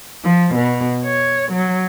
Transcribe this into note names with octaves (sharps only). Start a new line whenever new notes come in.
F3
B2
C#5
F#3